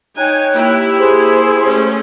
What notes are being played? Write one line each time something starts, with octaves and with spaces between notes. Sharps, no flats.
D#4 C#5 G5 G#5 F#6
A#3 E4 G4
G#4 C5
A3 C#4